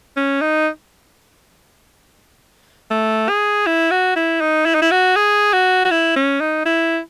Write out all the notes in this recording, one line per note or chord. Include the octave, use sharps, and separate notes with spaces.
C#4
D#4
A3
G#4
E4
F#4
E4
D#4
E4
D#4
E4
F#4
G#4
F#4
F#4
E4
C#4
D#4
E4